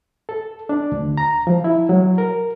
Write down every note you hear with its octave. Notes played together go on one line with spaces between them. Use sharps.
A4
D4
D2
A#5
F3
E4
F#3
A#4